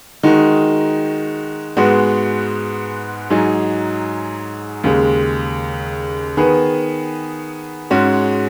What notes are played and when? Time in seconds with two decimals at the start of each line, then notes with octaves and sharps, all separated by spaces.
0.23 D#3 G#3 D#4 F#4
1.77 G#2 G#3 B3 F#4
3.30 G#2 F#3 D#4 G#4
4.84 D#2 C#3 G#3
6.37 D#3 B3 G#4 B4
7.90 G#2 G#3 C#4 F#4